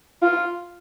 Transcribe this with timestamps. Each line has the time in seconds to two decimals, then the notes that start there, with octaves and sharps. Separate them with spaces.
0.22 F4